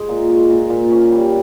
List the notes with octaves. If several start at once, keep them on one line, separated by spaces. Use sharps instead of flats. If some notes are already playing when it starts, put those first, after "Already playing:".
Already playing: G#3
A#2
G#3
A#2
A#2
C#4
G3